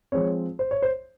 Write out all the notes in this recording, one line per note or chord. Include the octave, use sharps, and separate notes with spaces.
F3 G#3 C4 C#5
C5
C#5
C5